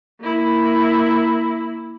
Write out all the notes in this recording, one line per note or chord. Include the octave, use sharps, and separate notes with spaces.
A#3 E4